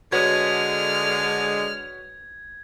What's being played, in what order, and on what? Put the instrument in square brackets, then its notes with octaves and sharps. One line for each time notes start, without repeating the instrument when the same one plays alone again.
[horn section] D3 G#3 [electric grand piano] F#4 B4 C#5 [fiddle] F6 [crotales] G#6